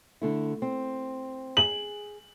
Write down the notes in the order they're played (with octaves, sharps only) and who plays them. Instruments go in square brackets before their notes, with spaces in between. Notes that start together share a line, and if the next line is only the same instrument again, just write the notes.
[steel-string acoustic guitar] D3 A3 E4
C4
[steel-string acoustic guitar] G#4 [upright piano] F#7